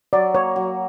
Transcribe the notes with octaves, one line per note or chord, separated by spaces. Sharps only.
F#3 D5
A#3 C#5
F#3